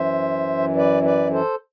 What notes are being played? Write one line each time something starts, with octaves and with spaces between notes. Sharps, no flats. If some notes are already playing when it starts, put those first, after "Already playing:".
Already playing: F#2 E3 C5 E5
B4 D5
B4 D5
A4 C5